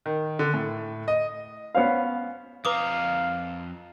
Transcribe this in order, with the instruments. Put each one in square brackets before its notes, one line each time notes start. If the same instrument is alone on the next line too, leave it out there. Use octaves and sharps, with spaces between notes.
[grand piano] D#3
D3
A2
D#5
[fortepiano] B3 C#4 C5 F5
[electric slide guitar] F2 A#5 [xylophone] B4 D6 D#6 [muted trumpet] F5